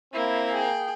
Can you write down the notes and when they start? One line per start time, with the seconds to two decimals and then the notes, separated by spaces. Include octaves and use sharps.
0.14 A#3 C4 E4
0.51 G#4 G5